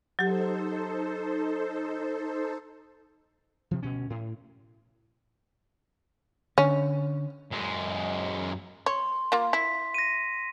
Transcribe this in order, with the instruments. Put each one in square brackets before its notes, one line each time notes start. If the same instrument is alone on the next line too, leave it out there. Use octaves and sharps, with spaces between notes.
[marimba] F#3 G4 [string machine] D#4 A4 C5
[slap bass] C3 F3
D2 B2 C#4
A2
[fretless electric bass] D3 [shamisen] C#4
[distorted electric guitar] F#2 G#3
[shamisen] C#5 [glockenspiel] C6
[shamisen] A#3 F4
[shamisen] E4 [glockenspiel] B6
[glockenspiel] A#6 D#7